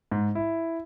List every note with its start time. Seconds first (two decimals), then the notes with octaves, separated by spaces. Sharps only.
0.12 G#2
0.35 E4